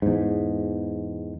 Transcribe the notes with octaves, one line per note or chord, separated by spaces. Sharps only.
E2 G#2